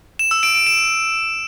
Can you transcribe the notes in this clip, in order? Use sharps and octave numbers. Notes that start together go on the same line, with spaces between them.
E7
E6
D7
D7
E7